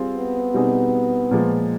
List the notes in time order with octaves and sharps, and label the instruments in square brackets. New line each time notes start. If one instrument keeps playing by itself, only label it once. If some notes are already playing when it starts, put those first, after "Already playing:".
Already playing: [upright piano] G3 C4 F4 G#4 C5
[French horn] B3
[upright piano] B2 G3 C4 D#4 G#4
A#2 F3 G#3